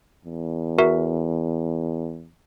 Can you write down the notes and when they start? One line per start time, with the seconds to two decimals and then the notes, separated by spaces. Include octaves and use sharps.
0.25 E2
0.78 F#4 A#4 E5